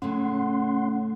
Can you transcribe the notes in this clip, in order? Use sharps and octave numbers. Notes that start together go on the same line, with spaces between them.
A2 C#3 A3 C#4 F#5 C6